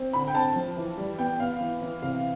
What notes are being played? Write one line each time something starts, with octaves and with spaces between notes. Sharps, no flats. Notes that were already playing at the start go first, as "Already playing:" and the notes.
Already playing: C4
D3 B5
G5
C4 A5
F3
E3
G3
B3 G5
B3 F5
E3
E3
C3 F5